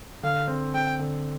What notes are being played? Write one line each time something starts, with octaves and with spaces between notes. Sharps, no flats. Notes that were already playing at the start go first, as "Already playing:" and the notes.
D3 F5
C4
C4 G5
D3